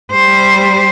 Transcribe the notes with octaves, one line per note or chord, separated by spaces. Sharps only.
G3 C5